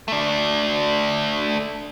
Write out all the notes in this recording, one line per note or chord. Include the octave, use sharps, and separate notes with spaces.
A3 D4